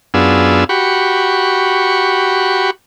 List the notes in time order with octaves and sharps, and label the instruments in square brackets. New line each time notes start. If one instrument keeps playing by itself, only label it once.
[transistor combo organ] F#2 B3 D4 F4 G#4 E6
F#4 G4 B5 C#6